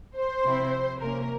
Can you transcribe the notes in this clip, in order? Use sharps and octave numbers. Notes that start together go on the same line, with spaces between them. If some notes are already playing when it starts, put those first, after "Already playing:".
C5
C3 F3 C4 E4
C3 F3 A#3 C#4 A#4